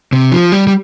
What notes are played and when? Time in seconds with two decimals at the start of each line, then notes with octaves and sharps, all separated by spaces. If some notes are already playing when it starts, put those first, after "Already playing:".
0.13 C3
0.32 F3
0.52 G3
0.67 G3